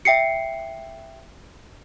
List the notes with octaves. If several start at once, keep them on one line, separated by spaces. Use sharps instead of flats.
E5 G5 C7 C#7